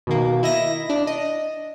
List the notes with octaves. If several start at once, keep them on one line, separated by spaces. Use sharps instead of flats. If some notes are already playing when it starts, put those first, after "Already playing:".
B2 D#3 A#3
E4 D#5 E5 A#6
D4
D#5